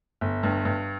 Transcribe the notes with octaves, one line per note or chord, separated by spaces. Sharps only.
G1
G2
G2